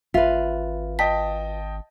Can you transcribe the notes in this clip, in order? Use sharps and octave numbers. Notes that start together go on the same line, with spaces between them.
G#1 F4 B4 E5
D#5 G5 A5 B6